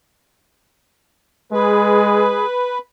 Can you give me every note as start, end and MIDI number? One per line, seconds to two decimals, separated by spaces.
1.52 2.45 56
1.52 2.46 68
1.52 2.78 71